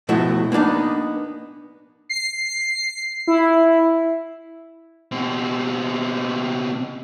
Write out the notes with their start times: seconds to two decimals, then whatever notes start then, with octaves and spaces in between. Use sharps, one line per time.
0.09 B2 F3 A3 E4 F#4
0.52 A#3 B3 D4 D#4
2.09 C7
3.27 E4
5.12 B2 C4